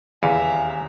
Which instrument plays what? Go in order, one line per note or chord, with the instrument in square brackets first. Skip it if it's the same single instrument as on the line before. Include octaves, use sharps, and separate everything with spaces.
[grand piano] D#1 F5 [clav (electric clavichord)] E2 E3 [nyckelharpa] E5 A#5 [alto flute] G#5